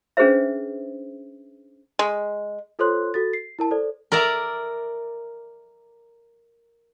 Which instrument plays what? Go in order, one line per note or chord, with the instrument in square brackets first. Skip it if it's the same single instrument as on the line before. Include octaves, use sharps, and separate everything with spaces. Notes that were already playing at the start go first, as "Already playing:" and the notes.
[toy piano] C#4 D4 G#4 B4 C5 E5
[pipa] G#3
[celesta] F4 A4 C5 C#5 C6 F#6
F#4 A4 A6
C7
E4 A#4 A5
A4 C5 D5
[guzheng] A#4 D5 E5 A#5